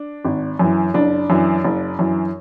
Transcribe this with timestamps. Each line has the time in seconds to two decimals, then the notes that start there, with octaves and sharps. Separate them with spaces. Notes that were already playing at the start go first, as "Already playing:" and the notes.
Already playing: D4
0.25 G#1
0.59 F#2 E3
0.94 F#1 D4
1.30 F#2 E3
1.64 F#1
1.99 F#2 E3